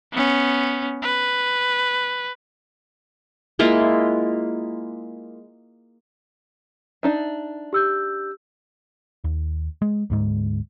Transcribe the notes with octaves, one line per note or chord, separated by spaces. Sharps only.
B3 C#4
B4
G#3 A#3 E4 F4
D4 D#4 E5
G4 E6 G6
D#2
G#3
D2 G#2 G#3